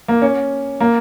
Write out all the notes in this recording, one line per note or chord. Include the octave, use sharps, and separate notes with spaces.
A#3
C#4
A#3